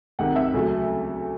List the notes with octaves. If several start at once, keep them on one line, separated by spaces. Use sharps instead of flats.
C2 C3 D#3 F#5
E5
D2 C#3 F#3 A3